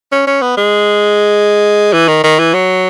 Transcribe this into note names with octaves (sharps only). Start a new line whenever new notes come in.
C#4
C#4
B3
G#3
E3
D#3
D#3
E3
F#3